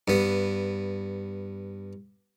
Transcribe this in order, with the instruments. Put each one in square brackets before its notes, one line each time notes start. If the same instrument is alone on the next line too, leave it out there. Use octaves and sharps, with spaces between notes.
[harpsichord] G2 B3